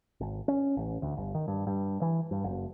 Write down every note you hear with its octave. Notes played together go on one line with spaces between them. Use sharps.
G#1
C#4
A1
D2
G1
D#3
G2
G2
E3
G2
F#1